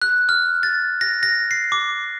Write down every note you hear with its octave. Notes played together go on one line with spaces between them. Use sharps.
F#6
F6
A6
A#6
A#6
C7
D6